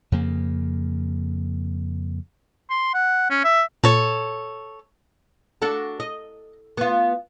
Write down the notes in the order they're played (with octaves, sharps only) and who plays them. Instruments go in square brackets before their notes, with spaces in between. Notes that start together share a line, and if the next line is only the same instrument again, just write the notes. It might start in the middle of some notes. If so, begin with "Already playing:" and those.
[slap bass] F2 C#3 A#3
[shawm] C6
F#5
C#4
E5
[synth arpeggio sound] A#2 [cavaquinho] A4 C#5
[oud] D4 F#4 A4
D#5
B3 F4